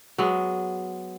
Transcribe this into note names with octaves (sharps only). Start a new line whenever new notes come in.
F#3 G#3 B3